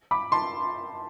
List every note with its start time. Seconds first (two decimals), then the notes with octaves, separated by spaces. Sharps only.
0.11 B5 D6
0.32 A5 C6